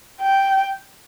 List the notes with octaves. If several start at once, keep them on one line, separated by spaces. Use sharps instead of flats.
G5